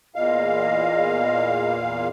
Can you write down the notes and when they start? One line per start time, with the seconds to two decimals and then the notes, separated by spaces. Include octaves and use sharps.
0.15 E2 A#2 D#5 F5